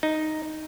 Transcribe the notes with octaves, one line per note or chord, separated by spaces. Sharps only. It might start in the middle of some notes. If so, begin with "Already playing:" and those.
D#4